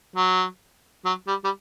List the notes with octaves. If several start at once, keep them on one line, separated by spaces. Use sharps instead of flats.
F#3
F#3
G3
G3